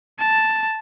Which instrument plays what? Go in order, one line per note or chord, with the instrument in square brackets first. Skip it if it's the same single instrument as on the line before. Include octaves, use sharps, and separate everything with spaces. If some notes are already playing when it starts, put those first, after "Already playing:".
[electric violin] A5